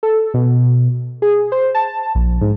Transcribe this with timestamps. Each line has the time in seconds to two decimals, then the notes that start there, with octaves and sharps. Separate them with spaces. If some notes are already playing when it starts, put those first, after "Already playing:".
0.03 A4
0.34 B2
1.22 G#4
1.52 C5
1.75 A5
2.15 A#1
2.41 G#2